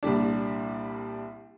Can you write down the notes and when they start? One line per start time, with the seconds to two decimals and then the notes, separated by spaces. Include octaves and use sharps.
0.03 C2 A#2 G3 D4